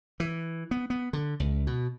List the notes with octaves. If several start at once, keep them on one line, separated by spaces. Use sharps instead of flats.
E3
B3
B3
D3
C#2
B2